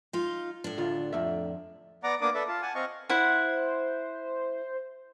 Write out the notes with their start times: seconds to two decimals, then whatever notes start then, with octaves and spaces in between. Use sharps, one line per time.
0.13 D#4 F4
0.64 A2 D4
0.78 D2 F4
1.13 F2 E5
2.03 B3 D5 F#5 A#5 D6
2.21 A#3 B3 D4 D5 D6 D#6
2.34 A4 B4 D5 E5
2.48 F4 A5
2.62 F#5 G#5 A5
2.75 C4 D#5 F5 C#6
3.09 E4 C5 F#5